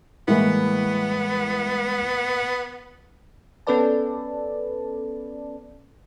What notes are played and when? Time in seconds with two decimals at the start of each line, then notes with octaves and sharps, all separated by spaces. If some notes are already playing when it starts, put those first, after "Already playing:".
0.28 A2 E3 G3 G#3 A#3 B3 E4
3.67 B3 C#4 A4 B4 D5 A5